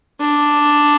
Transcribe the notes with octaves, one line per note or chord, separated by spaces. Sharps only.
D4